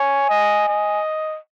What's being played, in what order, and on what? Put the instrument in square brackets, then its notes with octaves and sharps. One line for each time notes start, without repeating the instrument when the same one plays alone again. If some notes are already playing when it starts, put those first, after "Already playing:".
Already playing: [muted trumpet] C#5 [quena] G#5
[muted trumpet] D#5
D#5